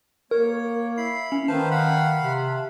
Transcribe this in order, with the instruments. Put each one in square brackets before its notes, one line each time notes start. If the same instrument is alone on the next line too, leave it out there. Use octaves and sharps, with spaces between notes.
[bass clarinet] A#3 [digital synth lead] A#4 [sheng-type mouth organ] C#5
[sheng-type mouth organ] E4 B5 [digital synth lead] C7
[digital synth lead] C#4
[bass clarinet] D#3 [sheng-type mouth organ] B4 C5 F5 [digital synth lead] A5
[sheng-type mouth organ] F5 F#5 B5
[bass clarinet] C3